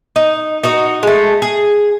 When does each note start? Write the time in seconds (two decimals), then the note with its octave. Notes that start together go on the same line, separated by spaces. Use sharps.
0.16 D#4
0.63 D#4 F#4 D#5
1.03 G#3 A3
1.42 G#4